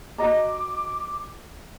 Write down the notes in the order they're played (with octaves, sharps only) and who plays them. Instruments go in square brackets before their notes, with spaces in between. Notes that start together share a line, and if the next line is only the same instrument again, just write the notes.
[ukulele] F#4 D#5 A#5 [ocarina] D6